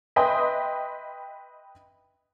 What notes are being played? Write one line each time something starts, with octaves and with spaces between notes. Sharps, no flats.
B4 D#5 E5 G5 C6 D#6